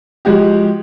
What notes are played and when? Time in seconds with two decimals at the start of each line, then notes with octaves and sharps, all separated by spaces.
0.25 F3 G#3 F#4 G4